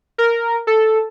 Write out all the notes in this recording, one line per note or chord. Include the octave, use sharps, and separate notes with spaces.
A#4
A4